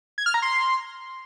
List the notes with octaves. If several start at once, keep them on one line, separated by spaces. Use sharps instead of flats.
G#6
F6
A#5
C6